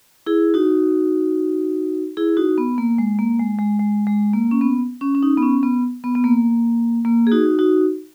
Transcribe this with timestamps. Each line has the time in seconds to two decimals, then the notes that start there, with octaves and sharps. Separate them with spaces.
0.26 E4 G#4
0.54 D#4 F#4
2.17 E4 G#4
2.37 D#4 F#4
2.58 B3
2.78 A#3
2.98 G#3
3.19 A#3
3.39 G#3
3.59 G#3
3.80 G#3
4.07 G#3
4.34 A#3
4.51 C#4
4.61 B3
5.01 C#4
5.15 C#4
5.23 D#4
5.38 B3
5.42 C#4
5.63 B3
6.04 B3
6.15 B3
6.24 A#3
7.05 A#3
7.27 G#4
7.32 D#4 F#4
7.59 D#4 F#4